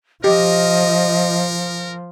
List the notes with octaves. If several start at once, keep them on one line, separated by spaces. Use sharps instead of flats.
F3 G4 A#4 D#5